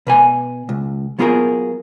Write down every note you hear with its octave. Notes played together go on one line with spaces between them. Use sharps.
B2 B4 G#5
C#2
F#3 B3 F4 G#4 A#4